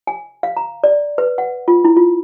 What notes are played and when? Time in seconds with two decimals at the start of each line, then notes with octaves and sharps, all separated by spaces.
0.07 G#5
0.43 F5
0.57 A#5
0.84 D5
1.18 B4
1.38 F#5
1.68 F4
1.85 E4
1.97 F4